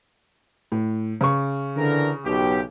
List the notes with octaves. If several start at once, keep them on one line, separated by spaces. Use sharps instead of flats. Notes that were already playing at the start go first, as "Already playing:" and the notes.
A2
C#3 C#6
D3 E3 A#4
B1 G4